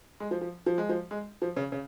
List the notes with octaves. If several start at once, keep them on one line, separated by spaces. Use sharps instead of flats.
G#3
F3
F3
F3
G#3
F3
G#3
F3
C#3
C#3